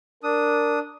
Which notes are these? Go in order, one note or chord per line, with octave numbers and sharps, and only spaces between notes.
D4 A#4 D#6